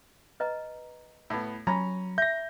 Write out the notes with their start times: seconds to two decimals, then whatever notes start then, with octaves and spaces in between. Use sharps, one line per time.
0.40 B4 D#5 A#5
1.30 A2 B3
1.67 F#3 C#4 A#5 B5
2.18 E5 G6 A#6